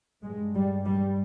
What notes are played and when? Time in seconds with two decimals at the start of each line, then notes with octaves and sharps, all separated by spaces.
0.23 G2 G#3
0.55 G3
0.86 G3